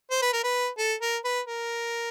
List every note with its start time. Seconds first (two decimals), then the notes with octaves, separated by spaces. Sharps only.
0.11 C5
0.22 B4
0.33 A#4
0.44 B4
0.78 A4
1.01 A#4
1.24 B4
1.47 A#4